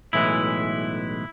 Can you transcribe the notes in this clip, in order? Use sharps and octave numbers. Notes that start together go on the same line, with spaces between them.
B1 A2 E3 G#3 E4